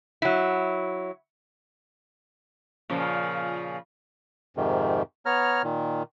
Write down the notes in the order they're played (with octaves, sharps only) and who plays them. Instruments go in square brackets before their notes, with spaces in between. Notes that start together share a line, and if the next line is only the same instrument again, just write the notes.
[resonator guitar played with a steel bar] F#3 E4
[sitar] A#2 C#3 F3
[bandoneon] F2 G#2 C3 D#3
B3 C#5 A#5 F6
A#2 D#3